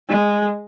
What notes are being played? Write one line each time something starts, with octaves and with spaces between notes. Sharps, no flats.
G#3